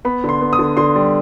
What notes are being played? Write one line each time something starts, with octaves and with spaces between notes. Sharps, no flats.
B3 B5
D3 C6
B3
D#6
D3
D3 C6
G3